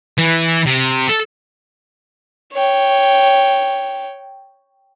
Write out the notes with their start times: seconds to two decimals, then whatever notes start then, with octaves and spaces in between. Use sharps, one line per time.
0.18 E3
0.66 C3
1.09 A4
2.54 C#5 G5